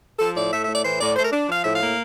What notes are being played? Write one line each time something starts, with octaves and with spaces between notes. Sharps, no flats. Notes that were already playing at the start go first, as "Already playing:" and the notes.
F3 A4
A2 D5
A3 E5
A2 E5
D5
E3 C5
A2 D5
A3 C5
A#4
D4
F3 F5
A2 E5
F5
A#3